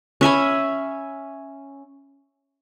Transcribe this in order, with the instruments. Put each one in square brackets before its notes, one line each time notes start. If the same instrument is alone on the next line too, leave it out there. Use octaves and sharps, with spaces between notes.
[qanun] C#4 E5 G#5 B5